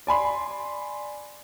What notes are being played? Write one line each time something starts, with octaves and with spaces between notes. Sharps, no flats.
D5 G#5 B5 C6